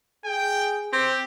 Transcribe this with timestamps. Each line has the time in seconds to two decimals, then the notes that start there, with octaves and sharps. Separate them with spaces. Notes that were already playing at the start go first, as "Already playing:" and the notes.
0.25 G#4 G5
0.93 C4 G4